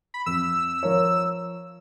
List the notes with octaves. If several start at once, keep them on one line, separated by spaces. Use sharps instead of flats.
B5
F2 E6
F3 A#4 C#5